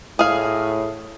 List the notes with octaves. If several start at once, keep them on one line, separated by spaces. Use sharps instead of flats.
A2 G#4 F5